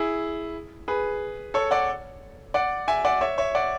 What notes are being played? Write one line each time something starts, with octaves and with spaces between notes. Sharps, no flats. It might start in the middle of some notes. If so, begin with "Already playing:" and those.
Already playing: E4 G#4
G#4 B4
A4 C#5
D5 F#5
D5 F#5
E5 G#5
D5 F#5
C#5 E5
C#5 E5
D5 F#5